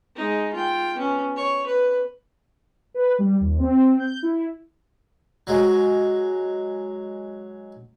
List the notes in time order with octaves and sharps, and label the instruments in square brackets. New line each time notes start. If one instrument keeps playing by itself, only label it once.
[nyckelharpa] G#3 D#4
F4 G5
B3 C#4
C#5
B4
[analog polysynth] B4
G3
D#2
C4
G6
E4
[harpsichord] F#3 G#3